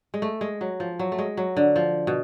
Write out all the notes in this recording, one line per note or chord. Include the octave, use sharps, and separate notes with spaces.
G#3
A3
G#3
F#3
F3
F#3
A3
G#3
F#3
D3
F3
B2